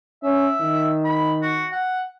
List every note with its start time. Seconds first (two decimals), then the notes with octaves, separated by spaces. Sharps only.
0.23 C#4 E5
0.61 D#3
1.05 B5
1.42 F#4
1.72 F#5